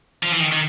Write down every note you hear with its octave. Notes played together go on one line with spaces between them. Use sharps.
F3
E3
D#3
D#3